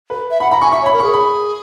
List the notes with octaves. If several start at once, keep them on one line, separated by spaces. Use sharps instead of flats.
B4
E5
F#5 B5
A#5 B5
G#5 C#6
E5 C#6
C#5 B5
A#4
G#4 C#6
B5